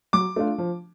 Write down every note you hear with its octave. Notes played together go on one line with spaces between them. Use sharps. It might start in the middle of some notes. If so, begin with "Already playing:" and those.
F#3 D6
A3 D4 F4
F3